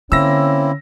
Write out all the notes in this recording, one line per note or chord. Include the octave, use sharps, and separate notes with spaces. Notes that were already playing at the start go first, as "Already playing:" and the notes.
D3 A#3 C4 C#4 E4 E6 A#6